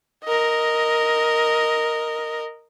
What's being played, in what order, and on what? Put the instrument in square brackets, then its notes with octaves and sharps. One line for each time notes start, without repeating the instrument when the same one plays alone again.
[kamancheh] A#4 D#5